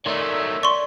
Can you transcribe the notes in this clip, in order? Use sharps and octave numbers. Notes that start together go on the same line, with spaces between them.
D#3 A3 G#4 A#4 C#5 D5 E5 C6
D5 C6 C#6